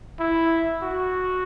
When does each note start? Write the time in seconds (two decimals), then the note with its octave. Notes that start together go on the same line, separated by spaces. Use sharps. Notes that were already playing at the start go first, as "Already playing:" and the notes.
0.19 E4
0.82 F#4